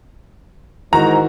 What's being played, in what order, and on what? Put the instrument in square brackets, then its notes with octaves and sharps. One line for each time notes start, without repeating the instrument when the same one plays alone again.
[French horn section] G#2 [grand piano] D#3 E3 F#4 [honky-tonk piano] A#5